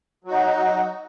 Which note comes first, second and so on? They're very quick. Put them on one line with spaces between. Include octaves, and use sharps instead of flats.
F#3 F#4 D#4